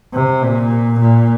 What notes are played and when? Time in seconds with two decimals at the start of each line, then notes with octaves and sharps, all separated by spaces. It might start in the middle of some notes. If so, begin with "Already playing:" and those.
0.14 C3
0.43 A#2
0.99 A#2